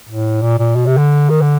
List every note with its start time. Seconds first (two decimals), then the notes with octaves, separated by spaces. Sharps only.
0.09 A2
0.42 A#2
0.59 A#2
0.76 B2
0.86 C3
0.97 D3
1.30 D#3
1.42 D3